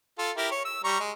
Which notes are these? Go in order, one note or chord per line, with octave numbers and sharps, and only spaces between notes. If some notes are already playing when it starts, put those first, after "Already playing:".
F4 A4
E4 G4 A#4
C#5
E6
G3 A#5 C#6
G#3